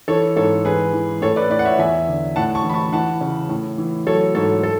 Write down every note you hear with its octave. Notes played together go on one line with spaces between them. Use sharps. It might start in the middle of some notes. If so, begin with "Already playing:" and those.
E3 A4 C#5
G#2 A4 C#5
E3 G#4 B4
E3
A2 A4 C#5
B4 D5
A2 B4 D5
F#5
C#5 E5
E2 E5 G#5
D3
A2 F#5 A5
A5 C#6
E3
B5
A5 C#6
E3 F#5 A5
C#3
A2
E3
F#3 A4 C#5
G#2 A4 C#5
A4